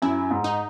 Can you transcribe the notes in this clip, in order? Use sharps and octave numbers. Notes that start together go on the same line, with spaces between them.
F#2 E4
G#2
D#4